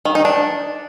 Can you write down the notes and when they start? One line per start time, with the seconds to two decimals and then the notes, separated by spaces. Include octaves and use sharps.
0.05 D#3
0.15 D#4
0.25 D4